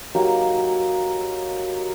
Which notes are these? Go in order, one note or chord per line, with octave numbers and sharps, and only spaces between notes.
F#3 A#3 D#4 G4